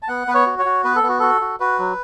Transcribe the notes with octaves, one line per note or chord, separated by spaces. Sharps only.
A5
B3 F#5
B3 B4
C#5
F#4
C#5
F#4
B3 B4
A4
B3
F#4
F#4 A4
F#4
F#4 B4
F#3